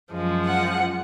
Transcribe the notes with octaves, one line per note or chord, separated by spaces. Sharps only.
F#2 F3 G#3
F#5